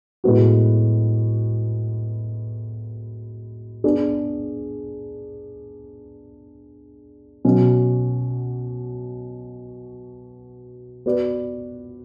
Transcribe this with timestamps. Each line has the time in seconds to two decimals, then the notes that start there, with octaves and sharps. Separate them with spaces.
0.24 A2 G#3 B3 F#4
3.84 B3 D4 G#4 D5
7.45 B2 F#3 C#4
11.06 B3 F#4 B4 D5